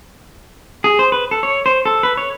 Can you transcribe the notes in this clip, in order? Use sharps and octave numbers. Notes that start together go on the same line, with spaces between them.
G#4
C5
B4
A4
C#5
C5
A4
B4
C#5